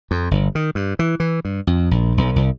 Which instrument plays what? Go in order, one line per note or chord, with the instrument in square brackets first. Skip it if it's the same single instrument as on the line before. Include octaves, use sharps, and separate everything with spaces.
[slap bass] F2
G1
D#3
G2
E3
E3
G2
F2
A#1
B1
C2